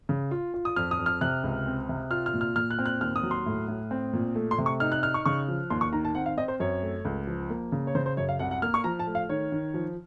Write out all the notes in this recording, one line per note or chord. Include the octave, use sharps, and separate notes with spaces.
C#3
F4
F4
D#6
F2 F6
D#6
F2
F6
C3 F#6
C#2
C4
C3
F4 F6
F6
A#2
F6
A#2 F6
F#6
C4
F#6
D#2 F6
D#6
F#3
C6
A2
A2
C4
A#2
A3
C6
C3
C#6
D#4 F6
F#6
D#4 F6
C#6
C#3 C#6
F3
D#2 C6
C#6
D#3 A#5
A5
C4 F#5
F5
C4 D#5
C5
F#2 C#5
A3
C#2
F3
A#3
C#3
C#5
C#3 C5
C5
F#2 C#5
F5
C2 F#5
F#5
A#3 F6
C#6
F3 A#5
A5
A3
F5
D#3 C#5
D#3
F3